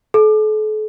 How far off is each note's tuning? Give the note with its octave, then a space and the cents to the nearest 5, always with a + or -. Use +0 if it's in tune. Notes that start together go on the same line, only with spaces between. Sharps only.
A4 -40